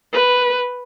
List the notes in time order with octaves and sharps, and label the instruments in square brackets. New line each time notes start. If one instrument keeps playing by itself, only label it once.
[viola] B4